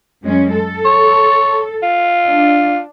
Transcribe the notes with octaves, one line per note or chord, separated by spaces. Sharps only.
F#2 G#3 C#4
A4
C#5
F4
D4